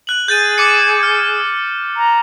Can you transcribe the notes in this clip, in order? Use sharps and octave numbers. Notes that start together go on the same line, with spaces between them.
F#6 F#7
G#4 G6 A6 D#7
D6 C#7
F6
A#5